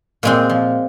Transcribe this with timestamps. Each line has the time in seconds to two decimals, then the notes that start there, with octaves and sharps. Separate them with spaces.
0.23 A#2 G#3 C4
0.50 F3